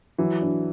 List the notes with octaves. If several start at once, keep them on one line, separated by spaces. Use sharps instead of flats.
E3 F#3
D4